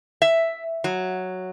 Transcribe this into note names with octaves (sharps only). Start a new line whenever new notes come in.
E5
F#3